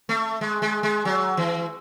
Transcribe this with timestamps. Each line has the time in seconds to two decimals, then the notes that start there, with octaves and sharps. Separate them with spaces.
0.09 A3
0.41 G#3
0.62 G#3
0.83 G#3
1.05 F#3
1.37 E3